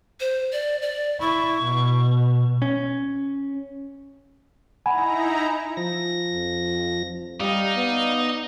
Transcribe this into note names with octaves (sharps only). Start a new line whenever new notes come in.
C5
D5
D5
E4 C#6
B2
C#4
D#4 E4 F#5 G#5 A#5 B5
F3 A#6
F2
G3 D#4 D5 F5
B3